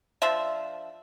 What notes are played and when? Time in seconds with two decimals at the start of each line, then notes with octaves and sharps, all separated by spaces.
0.22 F3 D4 C5 E5